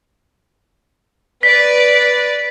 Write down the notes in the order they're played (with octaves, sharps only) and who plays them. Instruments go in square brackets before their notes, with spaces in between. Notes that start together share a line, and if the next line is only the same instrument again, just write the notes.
[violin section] B4 D5 [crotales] B6